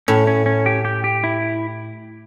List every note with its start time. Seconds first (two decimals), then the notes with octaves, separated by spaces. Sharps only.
0.08 A2 C#4
0.27 C#4
0.46 C#4
0.66 G4
0.85 G4
1.04 G4
1.24 E4